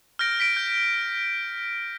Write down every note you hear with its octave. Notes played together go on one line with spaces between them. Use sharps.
F6 G6 A#6 D7
B6 D7
G6